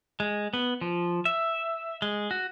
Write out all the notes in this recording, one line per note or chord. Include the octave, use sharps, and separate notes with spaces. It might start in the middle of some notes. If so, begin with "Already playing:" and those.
G#3
B3
F3
E5
G#3
F#4